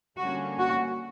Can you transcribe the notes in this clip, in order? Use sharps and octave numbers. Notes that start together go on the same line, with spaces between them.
D3 G3 A#3 C#4 F#4
F#4